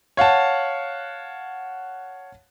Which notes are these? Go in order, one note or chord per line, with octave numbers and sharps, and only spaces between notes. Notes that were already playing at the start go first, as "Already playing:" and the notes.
C#5 F5 F#5 A5